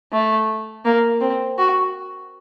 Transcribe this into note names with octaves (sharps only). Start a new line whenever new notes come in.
A3
A#3
C4
F#4